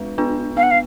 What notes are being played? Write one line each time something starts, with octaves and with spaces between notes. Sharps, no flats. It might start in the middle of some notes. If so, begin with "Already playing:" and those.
Already playing: G#3 D4 F4 B4
B3 D4 F4 B4
B3 F5
F#5
F5